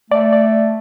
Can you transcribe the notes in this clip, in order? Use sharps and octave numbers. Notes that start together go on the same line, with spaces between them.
A3 D5
D5